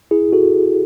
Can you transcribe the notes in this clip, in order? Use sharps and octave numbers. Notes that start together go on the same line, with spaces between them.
E4 G#4
F#4 A4